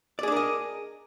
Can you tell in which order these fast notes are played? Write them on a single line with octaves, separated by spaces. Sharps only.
D5 G#4 D4 A#4 D#5